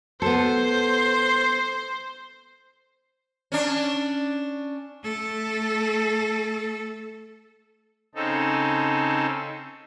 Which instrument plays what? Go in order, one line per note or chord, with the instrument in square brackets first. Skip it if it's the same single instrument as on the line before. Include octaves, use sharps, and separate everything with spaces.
[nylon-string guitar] B3 A4 [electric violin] C5
[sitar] C#4 D4
[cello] A3 A4
[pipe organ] C#3 C4 D#4 A4